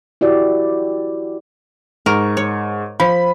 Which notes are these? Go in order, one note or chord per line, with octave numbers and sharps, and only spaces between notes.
E4 F#4 G4 D5
G#2 A#4 C#6
C#5
F3 B5